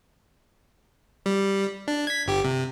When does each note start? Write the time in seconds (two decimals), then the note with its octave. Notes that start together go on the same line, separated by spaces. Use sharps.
1.26 G3
1.88 D4
2.07 G#6 B6
2.26 G1 G4
2.44 C3